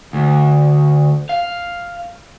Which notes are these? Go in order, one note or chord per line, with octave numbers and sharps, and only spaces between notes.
D2
F5